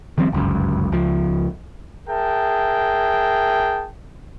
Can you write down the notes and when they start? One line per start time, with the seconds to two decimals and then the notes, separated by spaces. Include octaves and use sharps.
0.18 D#3 F3 G3 C4
0.32 G1 C#2 F#2
0.92 C#2 F3
2.08 G#4 A#4 E5 G5 A5